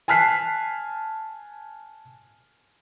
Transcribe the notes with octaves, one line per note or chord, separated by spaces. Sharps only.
G#5 A5 F6 F#6 B6 C7